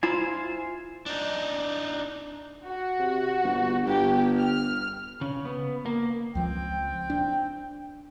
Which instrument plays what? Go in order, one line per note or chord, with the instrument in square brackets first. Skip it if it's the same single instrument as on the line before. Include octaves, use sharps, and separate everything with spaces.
[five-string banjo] E4 F4 A#5 [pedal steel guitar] C5 G#5
[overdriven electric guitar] D4 D#4
[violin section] F#4
[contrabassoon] C3
G1
[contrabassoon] G1 [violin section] G4
[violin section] F6
[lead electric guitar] C#3
B3
A#3
[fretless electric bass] C#2 F3 [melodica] C4 [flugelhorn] G5
[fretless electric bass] D4